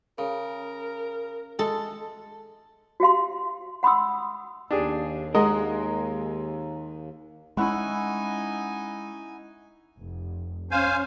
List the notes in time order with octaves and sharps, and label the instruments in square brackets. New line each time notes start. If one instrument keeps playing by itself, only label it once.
[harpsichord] C#3 [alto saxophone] A#4
[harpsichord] G#3 [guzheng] A4
[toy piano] F#4 G4 F5 C6
F#5 B5 C6 D#6 E6
[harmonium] D#2 [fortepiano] D4 G4 G#4
[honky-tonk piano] G#3 [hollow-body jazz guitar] A#4 [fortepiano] D#5 F#5
[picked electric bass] G#3 B3 C#4 [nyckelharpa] D#4 G#5 [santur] E4 F#5 C#6
[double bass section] F1
[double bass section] C#4 [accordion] C5 F5 G#5